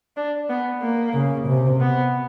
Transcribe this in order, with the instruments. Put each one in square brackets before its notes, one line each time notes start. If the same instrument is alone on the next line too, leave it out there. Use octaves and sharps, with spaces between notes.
[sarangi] D4
B3
A#3
[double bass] C#3
C3
[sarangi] B3